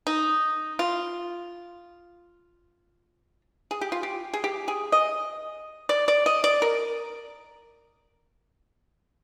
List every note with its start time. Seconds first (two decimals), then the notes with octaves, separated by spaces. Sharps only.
0.07 D#4
0.79 F4
3.71 G#4
3.81 G4
3.92 F4
4.03 G4
4.33 G#4
4.44 G4
4.68 G#4
4.92 D#5
5.89 D5
6.08 D5
6.26 D#5
6.44 D5
6.62 A#4